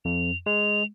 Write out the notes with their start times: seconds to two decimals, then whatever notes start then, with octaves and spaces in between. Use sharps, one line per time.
0.05 F2 F7
0.46 G#3 F7